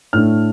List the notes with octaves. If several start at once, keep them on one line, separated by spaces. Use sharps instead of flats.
A2 A3 D4 F6